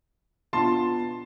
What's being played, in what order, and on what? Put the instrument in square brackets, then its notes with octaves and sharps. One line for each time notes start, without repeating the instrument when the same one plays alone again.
[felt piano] B2 B3 D4 F4 [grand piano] A5 C6